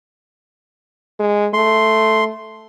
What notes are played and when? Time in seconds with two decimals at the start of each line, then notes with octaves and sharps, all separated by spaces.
1.19 G#3
1.53 A3 C6